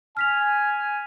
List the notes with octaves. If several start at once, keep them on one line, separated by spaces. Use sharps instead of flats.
G#5 F6 B6 F7